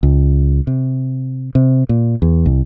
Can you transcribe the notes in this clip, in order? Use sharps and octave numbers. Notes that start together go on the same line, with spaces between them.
C#2
C3
C3
A#2
E2
C2